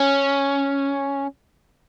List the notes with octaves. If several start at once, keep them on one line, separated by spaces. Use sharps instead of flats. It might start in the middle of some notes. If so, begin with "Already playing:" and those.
Already playing: C#4